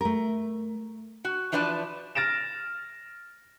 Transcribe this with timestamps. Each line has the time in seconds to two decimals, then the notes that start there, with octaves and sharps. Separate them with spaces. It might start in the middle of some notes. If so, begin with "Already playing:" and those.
0.01 A3 A#4
1.25 F#4
1.52 E3 F3 D4 B4 D5 A5
2.15 F6 A6 A#6 D7 E7